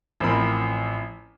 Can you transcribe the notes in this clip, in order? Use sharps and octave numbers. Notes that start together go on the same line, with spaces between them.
A1 F3 C4 A#4 B5